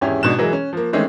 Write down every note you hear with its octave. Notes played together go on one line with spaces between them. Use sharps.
G#1 E2 C#4 E4 G4 G#4
G#1 G#2 B2 D4 F#6 E7
E3 F#3 G#3 G#4 A#4
C#4
F3 A#3
D#3 E3 G#3 A3 C4 C#4